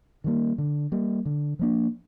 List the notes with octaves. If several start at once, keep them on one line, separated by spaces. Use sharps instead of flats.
D#3 G3 A#3
D3
G3 A#3
D3
F3 A#3 D4